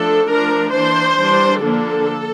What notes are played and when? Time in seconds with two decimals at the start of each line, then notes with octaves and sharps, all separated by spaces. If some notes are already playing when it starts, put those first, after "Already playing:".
Already playing: F3 A3 D4 A4
0.30 F3 A3 D4 A#4
0.73 E3 A#3 D4 C5
1.18 E3 G3 D4
1.61 D3 F3 A#3 D4 A4